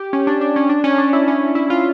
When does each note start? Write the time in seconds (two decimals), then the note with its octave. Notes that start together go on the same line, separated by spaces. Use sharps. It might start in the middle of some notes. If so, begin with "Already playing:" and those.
Already playing: G4
0.13 C#4
0.27 D4
0.41 D4
0.56 C#4
0.69 D4
0.84 C#4
0.98 D4
1.13 E4
1.28 C#4
1.55 E4
1.70 F4